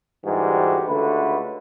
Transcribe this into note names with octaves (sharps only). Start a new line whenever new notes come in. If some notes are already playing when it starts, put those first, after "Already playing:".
D2 G#2 E3 G3 F#4 G4
C#2 D3 A3 F#4 B4